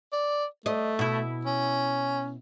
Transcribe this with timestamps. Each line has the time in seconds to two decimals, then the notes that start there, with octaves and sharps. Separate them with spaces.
0.13 D5
0.66 A3 D#5
0.99 B2 E4
1.45 C#4